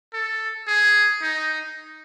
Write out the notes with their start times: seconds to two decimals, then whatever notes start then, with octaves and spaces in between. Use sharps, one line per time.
0.13 A4
0.67 G#4
1.22 D#4